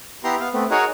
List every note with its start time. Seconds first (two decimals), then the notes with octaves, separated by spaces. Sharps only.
0.24 B3 E4 G4 A#5 C6
0.40 B3 F5
0.53 A3 B3 C4
0.71 D#4 F#4 G#4 A#4 C#5 F#5